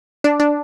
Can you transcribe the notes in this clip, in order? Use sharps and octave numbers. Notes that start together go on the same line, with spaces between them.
D4
D4